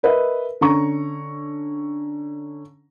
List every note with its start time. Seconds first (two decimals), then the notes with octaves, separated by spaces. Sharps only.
0.03 A#4 B4 D#5 E5
0.61 D3 C#4 A#5 C#6